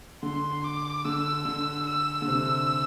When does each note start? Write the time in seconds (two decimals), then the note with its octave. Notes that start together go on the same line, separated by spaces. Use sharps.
0.22 D3 C6
0.64 D6
1.05 D3 E6
1.45 D3
1.87 E6
2.22 D3
2.27 C3